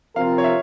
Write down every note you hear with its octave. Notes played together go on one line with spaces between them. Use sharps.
C3 F3 C4 F4 A#4 F5
C#5
E5